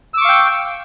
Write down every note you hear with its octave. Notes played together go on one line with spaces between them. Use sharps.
F5 G5 C#6 D6 E6